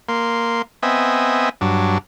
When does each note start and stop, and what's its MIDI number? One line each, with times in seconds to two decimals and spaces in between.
0.09 0.62 58
0.09 0.62 84
0.83 1.49 59
0.83 1.49 60
0.83 1.49 75
0.83 1.49 76
0.83 1.49 80
1.61 1.98 43
1.61 1.98 54
1.61 1.98 62